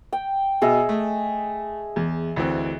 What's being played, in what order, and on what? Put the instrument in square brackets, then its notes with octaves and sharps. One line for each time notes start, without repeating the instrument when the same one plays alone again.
[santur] G5
[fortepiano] B2 [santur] G#4 D#5 E5
[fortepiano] A3
E2
D2 E3 C4